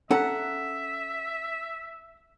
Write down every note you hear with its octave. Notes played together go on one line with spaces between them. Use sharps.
C#4 A4 E5 F#5 A#5